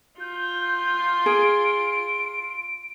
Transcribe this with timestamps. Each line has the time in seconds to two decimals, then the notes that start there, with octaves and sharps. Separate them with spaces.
0.20 F4 G6
1.26 G#4 D7